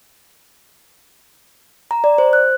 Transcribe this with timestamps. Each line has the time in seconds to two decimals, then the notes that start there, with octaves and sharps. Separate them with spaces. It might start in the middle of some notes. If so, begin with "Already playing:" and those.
1.91 A#5
2.04 D5
2.18 C5
2.33 F#6